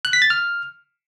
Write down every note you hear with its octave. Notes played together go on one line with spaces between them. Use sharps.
F#6
B6
A6
F6